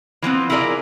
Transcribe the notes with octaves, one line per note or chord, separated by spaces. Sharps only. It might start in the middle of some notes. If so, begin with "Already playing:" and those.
E3 F3 B3 C4
E4 F4 G#4 A#4 D5